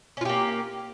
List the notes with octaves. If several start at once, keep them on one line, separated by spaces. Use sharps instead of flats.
A#3 C#4 F4 G4